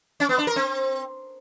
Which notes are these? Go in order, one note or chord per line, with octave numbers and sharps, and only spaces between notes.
C#4
B3
D4
A#4
C4